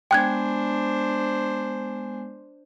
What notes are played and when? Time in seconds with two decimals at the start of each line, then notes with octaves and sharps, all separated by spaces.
0.11 G#3 B3 D4 C5 G5 G#5 F#6 G#6